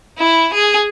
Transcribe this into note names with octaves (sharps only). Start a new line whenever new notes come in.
E4
G#4